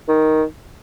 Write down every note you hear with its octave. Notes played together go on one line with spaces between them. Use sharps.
D#3